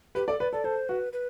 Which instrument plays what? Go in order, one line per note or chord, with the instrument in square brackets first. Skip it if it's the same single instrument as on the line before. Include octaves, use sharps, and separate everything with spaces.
[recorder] G4 [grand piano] B4
[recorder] A4 [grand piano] D5
[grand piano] B4 [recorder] D5
[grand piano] A4 [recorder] D5
[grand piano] A4 [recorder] C5
[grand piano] F#4 [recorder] B4
[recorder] B4